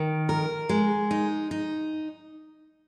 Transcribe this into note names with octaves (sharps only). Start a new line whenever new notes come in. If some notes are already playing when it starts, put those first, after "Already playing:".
Already playing: D#3
A#4
G#3
D#4
D#4